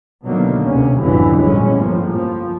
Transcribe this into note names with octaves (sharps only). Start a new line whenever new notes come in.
B2 D3 D#3 F#3 A#3
D2 C3 C#4
G#1 F2 B2 D3 E3 F#3
G1 A#2 G#3 C#4
A2 F3 A#3
F3